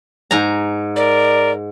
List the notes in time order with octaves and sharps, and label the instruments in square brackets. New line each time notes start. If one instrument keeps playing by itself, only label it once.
[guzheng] G#2 A#5
[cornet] A#4 [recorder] D5